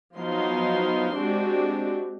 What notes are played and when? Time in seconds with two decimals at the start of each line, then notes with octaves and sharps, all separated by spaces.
0.16 F3 F#3 B3 D#4 F5 C6
1.14 G#3 C4 D4 F#4 G4